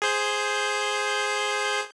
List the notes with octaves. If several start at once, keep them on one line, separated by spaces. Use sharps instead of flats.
G#4 C5 G6